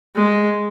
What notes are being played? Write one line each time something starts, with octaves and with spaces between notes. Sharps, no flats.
G#3